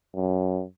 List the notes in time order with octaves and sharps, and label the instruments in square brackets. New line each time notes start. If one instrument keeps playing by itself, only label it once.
[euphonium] F#2